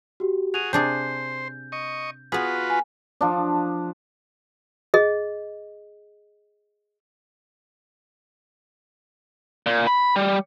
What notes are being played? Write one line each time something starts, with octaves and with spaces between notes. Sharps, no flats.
F#4 G4
F#4 G#4 D#7 F7
C3 D4 G#4 C5 G6
D#5 C#6
B3 F4 F#4 G#4 B4
G#5
F3 D4
G#4 D#5
A#2
B5
G3